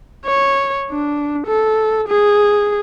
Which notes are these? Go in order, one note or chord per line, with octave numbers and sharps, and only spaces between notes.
C#5
D4
A4
G#4